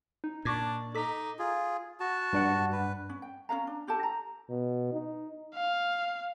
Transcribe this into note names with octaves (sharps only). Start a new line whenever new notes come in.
D#4
A#2 D4 C#6 D6 G#6
D#4 A4 D6 B6
F4 G#4
F#4 A5
G2 D4 F#5
B4
C#4
G5
C#4 A#4 F5 A#5
D4
F4 G4 A4 A5
A#5
B2
D#4
F5